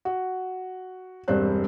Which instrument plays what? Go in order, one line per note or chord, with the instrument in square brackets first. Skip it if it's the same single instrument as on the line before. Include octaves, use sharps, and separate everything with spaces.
[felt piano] F#4
E1 G2 G3 C4 C5 F#6